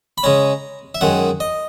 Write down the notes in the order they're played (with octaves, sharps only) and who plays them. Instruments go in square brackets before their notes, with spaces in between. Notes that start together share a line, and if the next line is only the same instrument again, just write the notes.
[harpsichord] B5
C#3 G#3 C#4 A#5
E5
F#2 D#3 G#3 F#5
D#5